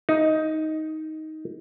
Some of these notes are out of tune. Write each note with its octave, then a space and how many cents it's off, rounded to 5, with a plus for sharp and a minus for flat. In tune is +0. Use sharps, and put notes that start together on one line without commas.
D#4 +10